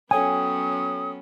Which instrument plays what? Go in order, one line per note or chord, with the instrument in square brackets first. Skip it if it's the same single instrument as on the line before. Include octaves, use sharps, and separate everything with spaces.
[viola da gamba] F#3 B3 C#4 [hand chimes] A4 C#5 G5 [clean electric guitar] G#5 [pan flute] D#6